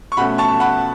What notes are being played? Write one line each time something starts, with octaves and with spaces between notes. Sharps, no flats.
C#6
B2 A3 C#4 F#5 B5
A5 C#6
F#5 B5